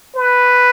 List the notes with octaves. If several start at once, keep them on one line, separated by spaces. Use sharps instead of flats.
B4